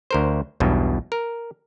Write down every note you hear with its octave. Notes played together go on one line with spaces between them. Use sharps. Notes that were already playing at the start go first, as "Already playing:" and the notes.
D2 A#4 C5
B1 E2 G2 B2
A#4